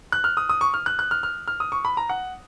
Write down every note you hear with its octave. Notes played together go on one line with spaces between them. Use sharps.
F#6
F6
D#6
D#6
C#6
F6
F#6
F#6
F6
F6
F6
D#6
C#6
B5
A#5
F#5